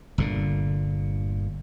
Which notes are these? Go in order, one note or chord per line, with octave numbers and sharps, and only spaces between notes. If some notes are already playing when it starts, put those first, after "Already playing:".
G1 A#2 D3